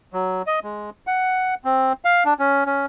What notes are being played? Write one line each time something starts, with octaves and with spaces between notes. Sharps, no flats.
F#3
D#5
G#3
F#5
C4
F5
D4
C#4
C#4